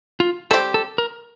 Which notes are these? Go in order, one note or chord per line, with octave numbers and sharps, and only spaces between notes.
F4
G3 C4 G4 A4
A4
A#4